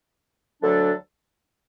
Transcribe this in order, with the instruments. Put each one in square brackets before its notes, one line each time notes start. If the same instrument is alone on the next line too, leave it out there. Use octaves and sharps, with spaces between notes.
[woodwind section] D2 D3 F#3 D4 A4